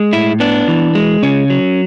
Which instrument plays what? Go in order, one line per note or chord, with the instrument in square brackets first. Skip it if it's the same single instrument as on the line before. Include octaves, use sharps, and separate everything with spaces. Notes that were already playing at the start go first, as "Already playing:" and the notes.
Already playing: [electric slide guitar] G#3
A2 E4
B3 D4
E3
G#3
C#3 C#4
F#3